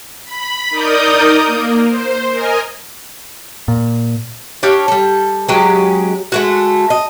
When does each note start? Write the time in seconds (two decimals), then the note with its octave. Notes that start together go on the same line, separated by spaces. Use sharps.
0.25 B5
0.70 D#4 A#4 D5 D#6 G6
1.46 A#3
1.88 C5
2.32 A#4 D#5 G#5
3.68 A#2
4.63 D4 G4 C#5 F5
4.88 G3 A4
5.48 F#3 G#3 C#4 G4
6.32 G#3 A3 F#4
6.90 D#5